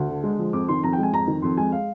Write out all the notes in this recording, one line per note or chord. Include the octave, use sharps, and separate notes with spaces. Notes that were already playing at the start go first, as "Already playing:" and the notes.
Already playing: D2
D3
G#3
F3
F2 D6
D#3 C6
F2 A#5
G5
G#3 G#5
F2 A#5
D#3
F2 C6
G#3 G#5
F5